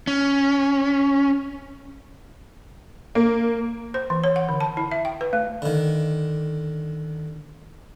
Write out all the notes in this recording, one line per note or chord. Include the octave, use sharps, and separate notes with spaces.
C#4
A#3
C5
E3
C#5
F#5
D3
A5
E4
E5
G5
B4
A3
D3 D#3